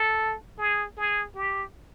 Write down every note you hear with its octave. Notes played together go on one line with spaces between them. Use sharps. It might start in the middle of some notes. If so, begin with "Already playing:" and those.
Already playing: A4
G#4
G#4
G4